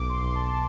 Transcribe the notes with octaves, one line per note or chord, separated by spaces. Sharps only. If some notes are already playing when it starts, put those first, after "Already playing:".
Already playing: B1 D6
C6
B1
A5